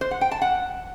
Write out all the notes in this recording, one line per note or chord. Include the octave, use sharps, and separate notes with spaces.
C5
F#5
G5
A5
F#5